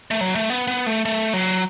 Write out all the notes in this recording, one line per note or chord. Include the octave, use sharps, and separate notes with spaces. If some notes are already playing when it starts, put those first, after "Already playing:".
A3
F#3
A3
B3
B3
A3
A3
F#3